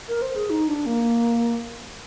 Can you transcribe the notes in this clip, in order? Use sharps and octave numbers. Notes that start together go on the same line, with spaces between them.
A#4
C5
G#4
D#4
D4
A#3